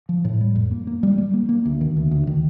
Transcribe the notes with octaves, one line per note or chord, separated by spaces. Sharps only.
F3
A2
G3
F2
A#3
A#3
G3
G3
A#3
A#3
D2
D#3
D2
D2
D#3